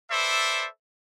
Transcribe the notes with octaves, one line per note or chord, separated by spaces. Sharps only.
A4 B4 C5 D5 E5